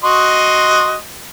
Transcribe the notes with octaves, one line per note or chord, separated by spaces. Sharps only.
F#4 D#5 C6